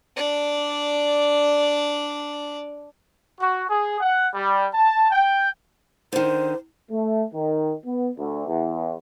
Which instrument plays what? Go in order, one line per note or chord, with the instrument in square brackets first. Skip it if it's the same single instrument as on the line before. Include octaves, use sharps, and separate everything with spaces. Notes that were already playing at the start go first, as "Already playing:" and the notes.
[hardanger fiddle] D4 D5
[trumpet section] F#4
G#4
F#5
G3
A5
G5
[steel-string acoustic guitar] D3 D#3 [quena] C5
[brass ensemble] A3
D#3
B3
D2
E2